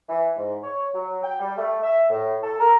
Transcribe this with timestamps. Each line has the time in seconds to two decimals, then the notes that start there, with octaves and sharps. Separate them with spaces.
0.09 E3
0.38 G#2
0.64 C#5
0.95 F#3
1.24 G5
1.40 G3
1.58 A3
1.84 E5
2.10 A2
2.44 A4
2.60 A#4